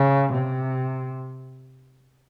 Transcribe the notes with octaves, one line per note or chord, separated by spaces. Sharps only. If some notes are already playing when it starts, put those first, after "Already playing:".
Already playing: C#3
C3